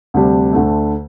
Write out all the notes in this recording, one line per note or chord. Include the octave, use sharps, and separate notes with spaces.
D2 C3 G3 D4
D2 D3 A3